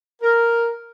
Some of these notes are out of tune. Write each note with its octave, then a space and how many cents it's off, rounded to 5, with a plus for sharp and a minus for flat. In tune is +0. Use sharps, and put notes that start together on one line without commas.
A#4 +0